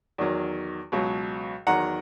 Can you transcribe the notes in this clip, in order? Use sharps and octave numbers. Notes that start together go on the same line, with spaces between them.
E2 D#3 F#3
C#2 B2 F#3
E2 D#3 F#3 F#5 A#5